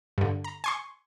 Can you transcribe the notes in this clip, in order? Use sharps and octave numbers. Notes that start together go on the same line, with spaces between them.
G2 D3
A#5
G#5 C6 C#6